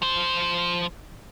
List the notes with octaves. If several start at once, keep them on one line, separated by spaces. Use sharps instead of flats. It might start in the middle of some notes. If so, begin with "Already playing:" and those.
F3 C5